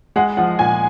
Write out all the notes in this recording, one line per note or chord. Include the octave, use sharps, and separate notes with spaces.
G#3 F#5
F3 F#5
A#2 G#5